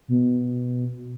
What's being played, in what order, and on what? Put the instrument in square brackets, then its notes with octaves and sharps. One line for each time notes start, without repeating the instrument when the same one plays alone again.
[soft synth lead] B2